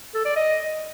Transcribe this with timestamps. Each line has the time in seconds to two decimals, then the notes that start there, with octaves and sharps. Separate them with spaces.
0.15 A4
0.25 D5
0.36 D#5